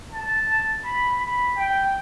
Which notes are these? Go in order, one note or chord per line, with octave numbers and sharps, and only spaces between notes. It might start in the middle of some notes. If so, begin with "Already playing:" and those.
A5
B5
B5
G5